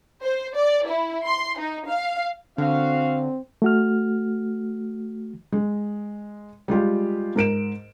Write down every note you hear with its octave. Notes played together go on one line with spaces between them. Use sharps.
C5
D5
E4
C6
D#4
F5
D3 C4 F#4 F5
A3 F#4 F6
G#3
G3 G#3 F4 G4
G#2 A#4 D7 E7